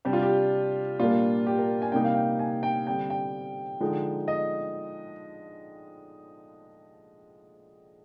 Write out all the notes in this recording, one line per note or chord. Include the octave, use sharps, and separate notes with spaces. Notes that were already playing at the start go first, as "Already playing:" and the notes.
C3 G3 D4 G4
F4
G4
A#2 G3 A#3 D4 F4
G4
A#4
G#5
C3 G3 A#3 D#4 G5
F5
G5
G#5
G5
D3 G3 C4 G5
G5
D3 F3 G#3 D#4
D#5